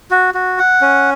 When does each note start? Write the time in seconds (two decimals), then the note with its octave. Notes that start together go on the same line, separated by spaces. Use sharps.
0.11 F#4
0.34 F#4
0.59 F#5
0.81 C#4